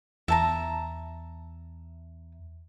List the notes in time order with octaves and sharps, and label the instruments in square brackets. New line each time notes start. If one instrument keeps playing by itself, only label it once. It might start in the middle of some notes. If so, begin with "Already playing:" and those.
[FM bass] E2 [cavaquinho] E5 A5 A#5